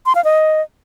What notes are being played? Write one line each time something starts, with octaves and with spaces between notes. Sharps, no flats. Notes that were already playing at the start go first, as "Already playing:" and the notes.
C6
F5
D#5